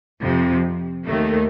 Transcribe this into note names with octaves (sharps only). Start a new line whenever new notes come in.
F2 C3 F3
D#2 D#3 A3